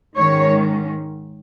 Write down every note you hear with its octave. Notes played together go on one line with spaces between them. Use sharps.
G#2 D#3 G#3 C#4 C#5